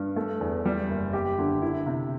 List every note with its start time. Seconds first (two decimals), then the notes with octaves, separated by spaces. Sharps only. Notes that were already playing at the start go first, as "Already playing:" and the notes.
Already playing: G2
0.16 A3
0.41 E2
0.65 G3
0.89 F#1
1.13 G4
1.38 D3
1.62 E4
1.86 C3